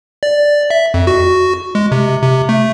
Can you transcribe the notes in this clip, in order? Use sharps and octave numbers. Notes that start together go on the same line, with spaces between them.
D5
E5
F2
F#4
G#3
C3
C3
A3